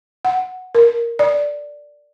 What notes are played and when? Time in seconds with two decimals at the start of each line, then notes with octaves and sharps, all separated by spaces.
0.25 F#5
0.75 A#4
1.19 D5